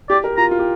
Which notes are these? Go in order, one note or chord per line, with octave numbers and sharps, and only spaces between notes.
G4 D5
A#4
F4 A#5
F4
G4